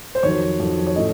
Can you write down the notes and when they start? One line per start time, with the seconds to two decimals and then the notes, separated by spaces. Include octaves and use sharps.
0.15 C5
0.23 F2 D#3 F#3 C#5
0.60 F2 D#3 F#3
0.87 C#5
0.96 A2 A3 C#4 D#5